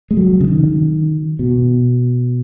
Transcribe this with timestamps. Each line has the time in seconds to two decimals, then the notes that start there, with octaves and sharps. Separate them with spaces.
0.11 G#3
0.17 F#3
0.41 C#3
0.47 D#3
1.39 B2